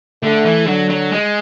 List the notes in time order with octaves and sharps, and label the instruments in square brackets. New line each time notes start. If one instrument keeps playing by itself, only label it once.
[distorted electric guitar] D3 [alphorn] A3
[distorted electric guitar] E3
[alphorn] D3 [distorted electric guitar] F#3
[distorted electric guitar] F#3
G#3